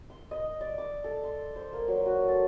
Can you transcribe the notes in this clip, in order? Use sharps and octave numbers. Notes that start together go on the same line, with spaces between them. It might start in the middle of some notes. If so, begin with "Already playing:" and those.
C6
D#5
D5
D6
A4
C6
C5
A#3
F#3
F#4
A4